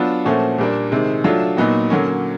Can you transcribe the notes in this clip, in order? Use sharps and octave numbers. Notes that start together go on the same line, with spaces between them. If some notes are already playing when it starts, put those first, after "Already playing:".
Already playing: F#3 B3 D4 F4
A#2 F3 A3 C#4 F#4
A#2 G3 A#3 D4
C3 D#3 G#3
F#3 A3 D4 F4
A#2 F#3 B3 D#4 F#4
D3 F#3 A#3 C#4